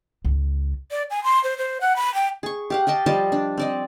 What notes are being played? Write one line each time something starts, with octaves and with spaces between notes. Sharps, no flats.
C#2
D5
G#5
C6
C5
C5
F#5
B5
G5
G#4 C#6
G4 F5 F#5
G4 D#5 G5 A5
F3 G3 D#5 A5
D4
C4 D5 D#5